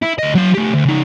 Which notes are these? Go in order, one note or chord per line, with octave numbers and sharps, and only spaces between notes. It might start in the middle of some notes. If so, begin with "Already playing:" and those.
E4
D2 D#5
F#3 F5
A3 G4
D2
C#3 D#4